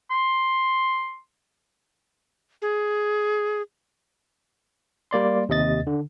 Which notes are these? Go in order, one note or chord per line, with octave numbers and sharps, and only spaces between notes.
C6
G#4
G3 A#3 D5 C6
D#2 C3 D#5 A6
D3